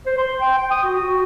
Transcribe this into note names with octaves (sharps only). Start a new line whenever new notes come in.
C5
C6
G5
G5
D#6
F#4
F#4